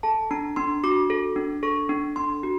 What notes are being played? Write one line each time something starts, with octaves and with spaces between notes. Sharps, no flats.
A4 A5
D4 A#5
D4 C6
F#4 D6
A4
D4
A4 C#6
D4
D4 C6
F#4